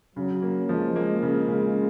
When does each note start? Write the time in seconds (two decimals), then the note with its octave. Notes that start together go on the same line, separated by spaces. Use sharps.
0.16 C#3 F#3
0.42 A#3
0.69 F3 G#3
0.96 A#3
1.23 C#3 G#3
1.48 C#3